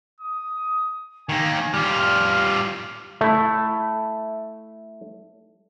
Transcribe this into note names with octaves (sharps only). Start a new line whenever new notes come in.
D#6
D#3 A#3 G#5
G3 F4 F6
A3 E4